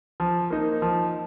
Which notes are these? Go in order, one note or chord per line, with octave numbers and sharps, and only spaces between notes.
F3
A#3 D#4
F3